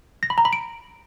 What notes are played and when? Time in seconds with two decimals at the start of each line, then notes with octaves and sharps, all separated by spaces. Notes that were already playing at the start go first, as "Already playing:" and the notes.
0.23 A#6
0.30 B5
0.38 A#5
0.45 B5
0.53 D7